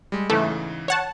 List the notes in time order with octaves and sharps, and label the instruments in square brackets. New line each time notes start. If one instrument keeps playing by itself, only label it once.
[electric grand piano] G3 G#3
[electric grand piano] G#2 C#3 E3 [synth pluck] A3
[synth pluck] C#5 F#5 A5